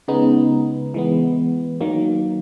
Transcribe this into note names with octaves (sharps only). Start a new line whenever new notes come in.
C#3 G#3 B3 D#4
E3 G#3 B3
D#3 F#3 A#3